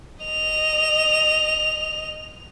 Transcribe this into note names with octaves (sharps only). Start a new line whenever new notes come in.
D#5 F7